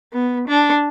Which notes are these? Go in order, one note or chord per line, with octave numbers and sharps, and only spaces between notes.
B3
D4